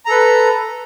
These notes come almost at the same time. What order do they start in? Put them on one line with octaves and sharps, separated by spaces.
A#5 A4 B4